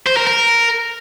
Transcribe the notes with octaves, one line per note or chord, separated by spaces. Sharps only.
C5
A#4
A#4